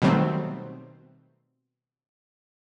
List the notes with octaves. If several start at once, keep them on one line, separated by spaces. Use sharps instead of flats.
B2 D#3 F#3 G3 A3 C4